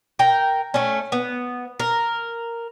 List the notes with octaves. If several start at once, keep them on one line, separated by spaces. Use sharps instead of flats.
A#4 G5
A3 C#4
B3
A#4